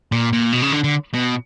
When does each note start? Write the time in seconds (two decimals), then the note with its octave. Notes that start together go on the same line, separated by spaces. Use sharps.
0.12 A#2
0.33 A#2
0.52 B2
0.62 C#3
0.72 D3
0.84 D3
1.14 B2